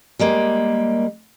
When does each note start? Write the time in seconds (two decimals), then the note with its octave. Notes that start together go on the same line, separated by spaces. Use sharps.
0.19 G3 G#3 A#3